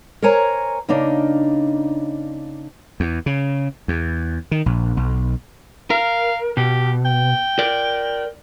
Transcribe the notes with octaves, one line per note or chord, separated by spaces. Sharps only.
A#4 C5 C#5 G#5 A#5
C#3 A#3 D4 D#4
E2
C#3
E2
D#3
A#1
B1
A#4 F5
B2 G4
G5
A#4 D5